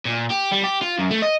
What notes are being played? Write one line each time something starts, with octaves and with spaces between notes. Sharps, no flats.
A#2
G4
G3
G4
F4
F#2
A3
D#5